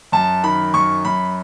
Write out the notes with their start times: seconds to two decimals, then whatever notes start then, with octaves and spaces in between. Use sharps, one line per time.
0.12 F#2 A5
0.43 D#3 B5
0.74 F#2 C#6
1.05 F#2 B5